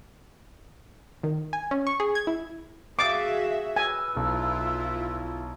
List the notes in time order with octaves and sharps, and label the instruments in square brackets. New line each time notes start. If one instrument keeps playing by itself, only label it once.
[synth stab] D#3
G#5
C#4
C#6
G#4
G#6
E4
[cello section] F#4 G#4 E5 [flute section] F5 [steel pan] D6 [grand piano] D#6 A6 C7
[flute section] B4 E6 F6 [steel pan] G#5
[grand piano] B1 [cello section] E4 F4